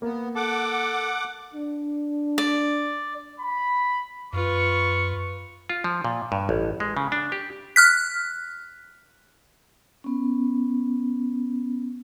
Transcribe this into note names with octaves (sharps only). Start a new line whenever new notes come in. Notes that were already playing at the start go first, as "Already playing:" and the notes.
A#3 B3
A4 F#5 D6
D4
D5
B5
F#2 F4 B4 C#6
F4
F3
A#2
G2
A1
G#3
C#3
D4
G4
F6 F#6 B6
B3 C#4